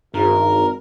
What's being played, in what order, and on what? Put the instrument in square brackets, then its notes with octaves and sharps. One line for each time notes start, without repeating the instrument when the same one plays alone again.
[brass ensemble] G#1 [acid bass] G2 [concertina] A#4